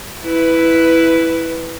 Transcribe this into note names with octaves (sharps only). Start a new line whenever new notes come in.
E4 B4